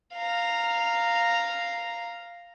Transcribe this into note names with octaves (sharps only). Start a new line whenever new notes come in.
F5 A#5